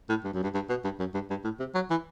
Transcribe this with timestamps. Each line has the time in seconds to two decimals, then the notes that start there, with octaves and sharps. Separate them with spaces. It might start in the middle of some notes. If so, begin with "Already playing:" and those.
0.09 A2
0.24 G2
0.33 F#2
0.43 G2
0.55 G2
0.69 B2
0.84 G2
0.99 F#2
1.14 G2
1.30 G2
1.44 A2
1.59 C3
1.75 F#3
1.90 E3